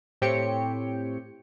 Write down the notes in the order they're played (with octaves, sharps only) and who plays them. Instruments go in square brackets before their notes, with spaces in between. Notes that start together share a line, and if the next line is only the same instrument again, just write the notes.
[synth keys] A2 C4 G4 C#5 G5 C#7